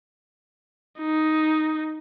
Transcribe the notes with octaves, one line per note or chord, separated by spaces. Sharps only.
D#4